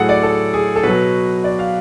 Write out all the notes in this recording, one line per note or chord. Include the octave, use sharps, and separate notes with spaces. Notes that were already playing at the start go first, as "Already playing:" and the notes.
Already playing: A2 F#3 G#4 A4 F#5
D5
A4
G#4
A4
B2 F#3 B4
D5
F5